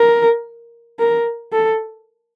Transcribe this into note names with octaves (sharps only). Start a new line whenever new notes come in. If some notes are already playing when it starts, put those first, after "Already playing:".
Already playing: A#4
A#4
A4